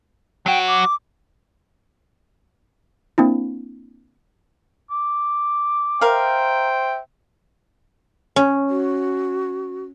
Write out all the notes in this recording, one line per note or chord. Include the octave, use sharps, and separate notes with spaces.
F#3 F#4 G5
D6
A#3 C4 D4 E4
D6
A#4 C5 E5 F5 G5
C#4
F#4